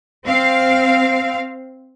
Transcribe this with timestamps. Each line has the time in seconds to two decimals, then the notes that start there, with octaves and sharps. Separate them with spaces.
0.25 C4 F5